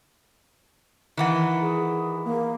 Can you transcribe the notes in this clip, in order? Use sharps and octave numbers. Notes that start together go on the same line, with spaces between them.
D#3 E3 F#5
G#4
A#3